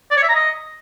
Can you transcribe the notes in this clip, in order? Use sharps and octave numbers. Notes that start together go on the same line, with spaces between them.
D5
C#5
E5
A#5
D#5